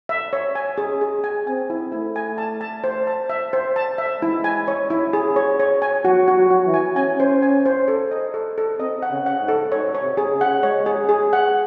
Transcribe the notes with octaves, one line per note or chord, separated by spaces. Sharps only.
E5
C#5
G#5
G#4
G#4
G#5
C4 G#5
E4
A3 E4
G#5
A5
A5
C5
A5
E5
C5
A5
E5
G#3 E4
G#5
C#5
E4
G#4
C#5
C#5
G#5
F#3 F#4
F#4
F#3
F#4
E3
G#5
C#4 G#5
C5
G#5
C5
A4
D#5
A4
A4
C4 D#5
F#5
C#3
F#5
G#2
A4
G#2 C#5
C#5
C3
G#4
C#3
F#5
G#3 C#5
G#4
G#4
F#5